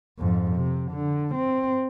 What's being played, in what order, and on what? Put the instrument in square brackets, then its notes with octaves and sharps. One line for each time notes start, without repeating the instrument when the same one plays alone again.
[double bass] F2 G#2
C3
D3
C4